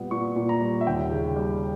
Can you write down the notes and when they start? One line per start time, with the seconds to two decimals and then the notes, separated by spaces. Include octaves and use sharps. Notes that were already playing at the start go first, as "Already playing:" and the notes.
Already playing: A#2 G3 B3
0.11 A#2 C#6
0.36 A#2
0.49 A#5
0.61 G3
0.81 E5
0.87 D#2 G5
1.11 C#3
1.36 G3